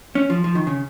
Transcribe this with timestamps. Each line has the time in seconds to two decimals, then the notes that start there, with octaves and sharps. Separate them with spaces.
0.15 C#4
0.30 F3
0.44 F3
0.55 D#3
0.67 C#3